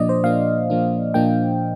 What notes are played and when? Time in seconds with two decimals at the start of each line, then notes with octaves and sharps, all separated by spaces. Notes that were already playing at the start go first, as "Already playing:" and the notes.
Already playing: A#2 F3 A#3 D4 D5 D#5
0.09 C5
0.24 A#2 F3 A#3 D4 F5
0.70 A#2 F3 A#3 D4
1.14 A#2 F3 A#3 D4 G5